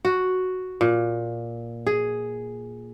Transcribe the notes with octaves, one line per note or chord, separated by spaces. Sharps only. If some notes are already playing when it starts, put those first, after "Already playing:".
F#4
A#2
G#4